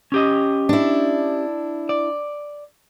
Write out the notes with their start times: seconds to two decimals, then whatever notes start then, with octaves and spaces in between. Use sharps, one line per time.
0.12 C#4 G4 D#5
0.69 D4 E4
1.89 D5